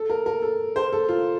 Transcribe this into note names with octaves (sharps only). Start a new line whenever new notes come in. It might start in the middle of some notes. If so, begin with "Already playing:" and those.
Already playing: A4
A#4
A#4
A4
C5
A4
F4